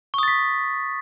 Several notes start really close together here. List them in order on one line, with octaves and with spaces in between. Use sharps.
C#6 D#6 A6 B6